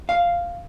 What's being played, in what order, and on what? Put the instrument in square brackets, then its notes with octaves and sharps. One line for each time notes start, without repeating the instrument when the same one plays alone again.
[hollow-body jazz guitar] F5